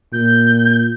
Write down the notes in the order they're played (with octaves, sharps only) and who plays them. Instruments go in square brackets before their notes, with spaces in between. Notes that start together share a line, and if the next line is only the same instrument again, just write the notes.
[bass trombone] A#2 [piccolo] G6